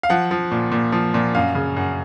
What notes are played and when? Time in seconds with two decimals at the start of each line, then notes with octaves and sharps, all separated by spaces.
0.03 F5
0.10 F3 F#5
0.31 F3
0.51 A#2
0.72 A#2
0.92 F3
1.14 A#2
1.35 F#2 F5
1.55 C#3
1.77 F#2